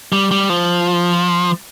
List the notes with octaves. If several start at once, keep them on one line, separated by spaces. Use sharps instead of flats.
G3
G3
F3